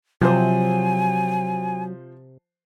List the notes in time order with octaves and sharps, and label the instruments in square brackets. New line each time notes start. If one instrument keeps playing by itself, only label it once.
[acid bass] C3 [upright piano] F3 C5 [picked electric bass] F#3 [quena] G#5